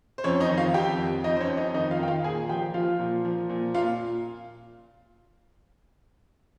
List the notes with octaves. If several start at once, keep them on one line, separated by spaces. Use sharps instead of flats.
C5
F2 C#4 C#5
D#4 D#5
D#3
F4 F5
F2 G4 G5
F2
F2 D#4 D#5
C5
C#4 C#5
F2
D#4 D#5
D#3 D#4 D#5
F4 F5
D#3 G5
F4 F5
A#2 G#4 G#5
F3 G4 G5
F3 F4 F5
A#2
F3
A#2
A#2 F4 F5